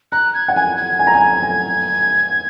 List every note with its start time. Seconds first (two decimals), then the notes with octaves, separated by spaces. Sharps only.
0.12 A#5 F#6
0.34 G#6
0.48 F#5
0.56 G#5 G#6
0.77 G#6
0.99 G#5
1.07 A#5
1.14 G#5
1.43 G#5